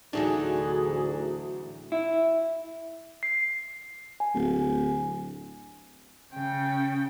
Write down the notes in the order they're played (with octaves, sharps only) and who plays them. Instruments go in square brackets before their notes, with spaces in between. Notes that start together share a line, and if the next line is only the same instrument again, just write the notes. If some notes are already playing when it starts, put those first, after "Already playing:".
[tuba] D2 [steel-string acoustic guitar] A2 E3 F#3 [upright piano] D4 D#4 [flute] G#4
[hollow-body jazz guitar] E4
[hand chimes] C7
G#5
[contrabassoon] D1
[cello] C#3 G5